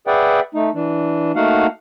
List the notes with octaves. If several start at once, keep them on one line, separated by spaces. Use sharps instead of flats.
G#4 B4 D5 E5 F#5 G5
A3 D#4
E3 D4
A3 A#3 D#4 F#4 F5 F#5